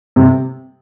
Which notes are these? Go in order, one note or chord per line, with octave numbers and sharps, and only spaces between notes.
C3